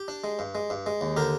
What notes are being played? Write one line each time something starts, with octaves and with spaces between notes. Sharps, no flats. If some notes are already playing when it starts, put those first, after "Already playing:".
Already playing: G4
D4
G#3
G2
G#3
G2
G#3
D#2
D3 G4 A#4